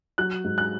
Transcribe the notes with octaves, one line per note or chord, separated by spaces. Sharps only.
F#3 F#6
G#2
F#6